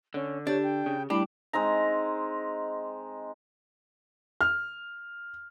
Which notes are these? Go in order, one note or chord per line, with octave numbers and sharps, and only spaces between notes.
D3 C#4
D4 G4 C#5 G6
G5
C#3
G3 A3 D4 E4 G4 B5
G#3 C4 D#4 A#5
F6